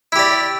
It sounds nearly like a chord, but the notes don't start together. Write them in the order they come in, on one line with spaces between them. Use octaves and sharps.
E4 G4 D5